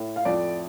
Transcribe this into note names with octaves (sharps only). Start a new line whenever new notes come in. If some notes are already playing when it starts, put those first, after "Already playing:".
Already playing: A2
F5
F2 D5